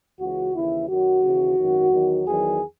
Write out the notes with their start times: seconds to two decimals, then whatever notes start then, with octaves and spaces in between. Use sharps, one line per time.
0.20 C#2 C#3 E3 F#4
0.54 D#2 C#3 E3 E4
0.89 F#2 D#3 F#3 F#4
1.24 D#2 C#3 E3
1.58 G#1 F#2 D#3 F#3
1.91 E2 D#3 F#3
2.26 E2 D#3 F#3 G#4